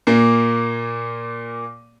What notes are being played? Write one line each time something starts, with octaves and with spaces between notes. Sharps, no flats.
A#2 A#3